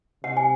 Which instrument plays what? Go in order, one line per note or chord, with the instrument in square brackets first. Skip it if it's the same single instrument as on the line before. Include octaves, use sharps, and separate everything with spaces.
[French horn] C3 [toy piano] F#5
[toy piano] G#5